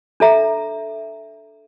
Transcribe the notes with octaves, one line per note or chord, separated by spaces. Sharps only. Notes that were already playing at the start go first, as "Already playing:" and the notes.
D4 A4 E5 A#5